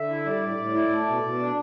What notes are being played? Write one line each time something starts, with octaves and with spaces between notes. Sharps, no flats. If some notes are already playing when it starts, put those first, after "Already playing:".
Already playing: D3 E5
E4
G3 D5
A2
A2
E4
A3
B2
B2
D4